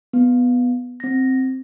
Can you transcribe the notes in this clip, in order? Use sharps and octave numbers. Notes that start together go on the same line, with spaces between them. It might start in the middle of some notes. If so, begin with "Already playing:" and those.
B3
C4 A#6